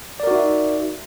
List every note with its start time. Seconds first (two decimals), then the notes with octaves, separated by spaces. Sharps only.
0.20 D5
0.23 A#4
0.27 F#4
0.31 D#4
0.35 E5